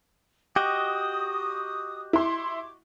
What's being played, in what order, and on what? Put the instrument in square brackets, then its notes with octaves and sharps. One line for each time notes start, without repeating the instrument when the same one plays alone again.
[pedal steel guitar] F#4 D#5 [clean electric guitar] G4 [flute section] D#6
[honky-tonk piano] E4 C6 [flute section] D6